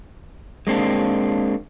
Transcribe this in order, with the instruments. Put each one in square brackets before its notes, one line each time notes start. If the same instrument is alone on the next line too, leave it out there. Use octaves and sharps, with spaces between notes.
[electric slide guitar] G#3 A#3 C4 D4